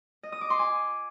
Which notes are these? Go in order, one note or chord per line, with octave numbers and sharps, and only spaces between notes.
D#5
D#6
D6
C6
G#5